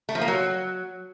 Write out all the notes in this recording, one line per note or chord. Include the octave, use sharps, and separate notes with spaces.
A3
F3
A#3
F#3